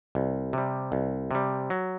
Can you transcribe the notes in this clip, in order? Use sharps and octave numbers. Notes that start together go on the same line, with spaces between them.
C2
C3 G3
C2
C3 G3
F#3